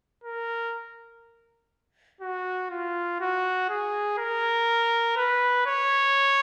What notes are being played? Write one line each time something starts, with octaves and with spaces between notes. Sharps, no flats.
A#4
F#4
F4
F#4
G#4
A#4
B4
C#5